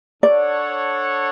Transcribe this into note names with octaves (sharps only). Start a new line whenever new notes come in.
D4 A4 C#5 D5 F#5